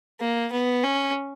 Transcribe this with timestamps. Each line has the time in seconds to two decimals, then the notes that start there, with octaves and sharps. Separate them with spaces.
0.20 A#3
0.52 B3
0.84 C#4